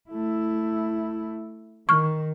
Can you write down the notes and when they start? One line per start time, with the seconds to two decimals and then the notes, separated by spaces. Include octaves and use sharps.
0.10 A3 E4
1.89 D#3 C#6 F6